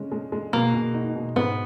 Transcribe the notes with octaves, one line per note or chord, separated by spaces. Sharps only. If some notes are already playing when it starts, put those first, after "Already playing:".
Already playing: C#3 G#3 C#4
G#3
G#3
B2 A#3
B2
D#4
B2
G#2 B3